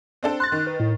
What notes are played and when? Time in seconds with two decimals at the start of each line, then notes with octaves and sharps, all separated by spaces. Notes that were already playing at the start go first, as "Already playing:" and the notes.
0.23 C4 D4 A4
0.40 C6 F#6 A6
0.52 D#3
0.67 B4
0.80 A2